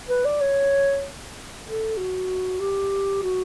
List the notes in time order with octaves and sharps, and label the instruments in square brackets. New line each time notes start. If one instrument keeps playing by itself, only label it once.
[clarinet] B4
D5
C#5
A4
F#4
G4
F#4